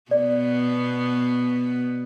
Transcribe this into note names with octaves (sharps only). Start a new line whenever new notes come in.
B2 B3 D5